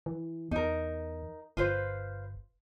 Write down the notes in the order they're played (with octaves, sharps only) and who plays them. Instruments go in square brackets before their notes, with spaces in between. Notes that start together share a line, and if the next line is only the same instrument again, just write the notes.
[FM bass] E3
[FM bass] E2 [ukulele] D#4 A#4
[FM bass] G1 [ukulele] F4 B4 C5